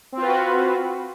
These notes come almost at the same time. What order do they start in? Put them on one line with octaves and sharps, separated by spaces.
C4 F4 B4 F#4